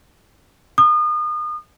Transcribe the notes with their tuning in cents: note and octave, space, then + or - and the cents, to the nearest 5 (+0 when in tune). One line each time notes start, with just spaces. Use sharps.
D#6 -35